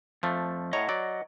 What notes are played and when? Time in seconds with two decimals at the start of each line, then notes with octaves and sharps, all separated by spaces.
0.23 F2 F3 A3
0.73 A2 C#5 D#5 F#5 A#5
0.89 F#3 D5